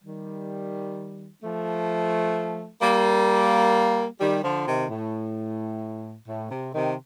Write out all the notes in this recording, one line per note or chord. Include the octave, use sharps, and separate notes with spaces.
D#3 G3
F3 A3
G3 A#3
D#3 G3
D3 F3
C3 D#3
A2
A2
C3
C3 D#3